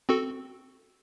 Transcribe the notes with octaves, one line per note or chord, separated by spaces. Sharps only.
C4 F#4 A4